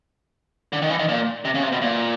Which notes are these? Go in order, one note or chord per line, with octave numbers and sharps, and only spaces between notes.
D3
D#3
E3
D#3
A#2
C3
C#3
C3
B2
A#2